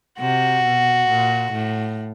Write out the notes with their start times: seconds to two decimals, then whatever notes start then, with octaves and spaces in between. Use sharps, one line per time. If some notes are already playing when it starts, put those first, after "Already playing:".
0.20 C3 F#4
0.64 B2
1.08 A#2
1.52 A2